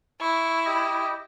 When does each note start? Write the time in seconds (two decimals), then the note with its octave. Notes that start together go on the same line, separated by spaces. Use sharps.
0.21 E4 C#6
0.66 G4 D#5